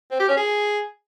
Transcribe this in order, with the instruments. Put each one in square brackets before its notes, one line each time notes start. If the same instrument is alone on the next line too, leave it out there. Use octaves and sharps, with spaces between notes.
[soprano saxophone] C4
G4
C#4
G#4